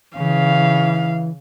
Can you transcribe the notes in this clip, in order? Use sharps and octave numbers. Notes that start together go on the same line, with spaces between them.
C#3 E3 F5